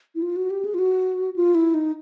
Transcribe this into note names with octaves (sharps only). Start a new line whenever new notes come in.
E4
F4
F#4
G4
G#4
F4
F#4
F4
E4
D#4